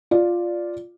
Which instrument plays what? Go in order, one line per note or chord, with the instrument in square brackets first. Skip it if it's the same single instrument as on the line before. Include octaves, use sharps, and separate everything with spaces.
[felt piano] F4 D5